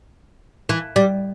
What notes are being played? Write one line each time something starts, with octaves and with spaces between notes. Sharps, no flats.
E3
G3